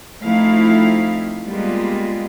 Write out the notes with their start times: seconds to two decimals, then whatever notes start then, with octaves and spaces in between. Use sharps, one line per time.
0.23 F3 A3 C4 D#4 E4 F5
1.45 G3 G#3 A#3 B3 F4